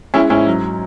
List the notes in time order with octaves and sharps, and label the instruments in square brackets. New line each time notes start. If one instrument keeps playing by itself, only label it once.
[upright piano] G#3 C#4 E4
G#2 C#4 E4
F#3